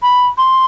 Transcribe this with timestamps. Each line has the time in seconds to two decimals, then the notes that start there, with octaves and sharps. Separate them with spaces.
0.02 B5
0.38 C6